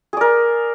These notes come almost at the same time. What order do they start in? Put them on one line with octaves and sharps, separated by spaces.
G#4 D5 A#4